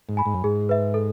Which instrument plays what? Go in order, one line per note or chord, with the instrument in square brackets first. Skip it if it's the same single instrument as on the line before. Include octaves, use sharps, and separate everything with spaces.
[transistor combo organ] G#2
[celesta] G#5 B5
[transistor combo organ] G#2
F#2
[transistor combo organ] G#2 [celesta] G#4
[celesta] B4 E5
A4